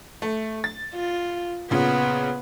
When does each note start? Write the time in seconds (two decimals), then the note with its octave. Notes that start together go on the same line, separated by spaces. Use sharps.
0.22 A3
0.64 A6
0.94 F4
1.71 A#2 C#3 B3